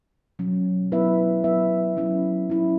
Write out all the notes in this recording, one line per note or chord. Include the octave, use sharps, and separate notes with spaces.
B2 F#3 C#4
F#3 B3 E4 B4 E5
F#3 B3 E4 B4 E5
F#3 C#4 E4
F#3 C#4 E4